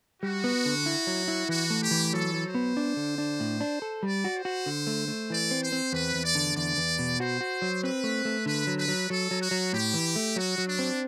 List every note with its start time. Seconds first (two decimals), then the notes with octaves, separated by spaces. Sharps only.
0.23 G3 F#4
0.44 B3
0.66 D3
0.86 E4
1.07 F#3
1.28 E4
1.49 E3 F#4
1.70 A3
1.81 G4
1.91 E3
2.13 F#3 A4
2.34 F#3
2.45 C5
2.55 B3
2.77 D4
2.97 D3
3.18 D4
3.40 A2
3.61 D4
3.82 A4
4.02 G3 D5
4.25 F#4
4.35 C5
4.45 F#4
4.66 D3
4.87 A3
5.08 A3
5.29 E3 D5
5.51 C4
5.62 C5
5.72 C4
5.93 E2 B4
6.15 E2
6.24 D5
6.35 D3
6.56 E2 D5
6.77 E2
6.99 B2
7.20 F#4 C5
7.41 F#4
7.62 F#3
7.83 C4 B4
8.04 A3
8.25 A3
8.46 D3 B4
8.67 F#3
8.78 B4
8.88 F#3
9.09 F#3 A4
9.31 F#3
9.41 F#4
9.51 F#3
9.73 A2 G4
9.94 E3
10.16 A3
10.36 F#3 F#4
10.58 F#3
10.68 D4
10.79 C4